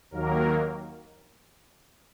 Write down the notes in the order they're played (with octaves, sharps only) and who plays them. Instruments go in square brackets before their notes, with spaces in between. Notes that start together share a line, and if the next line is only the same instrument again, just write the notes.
[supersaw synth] D#2 D#3 F#3 A#3 A#4